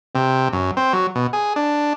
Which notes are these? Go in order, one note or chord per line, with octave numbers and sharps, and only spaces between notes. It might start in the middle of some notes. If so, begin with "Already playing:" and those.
C3
F#2
C4
F#3
B2
G#4
D4